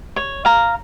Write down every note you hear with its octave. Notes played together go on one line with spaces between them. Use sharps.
C#5
F5 A#5